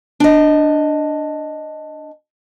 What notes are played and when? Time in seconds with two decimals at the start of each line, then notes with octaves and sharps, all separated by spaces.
0.20 D4 D#5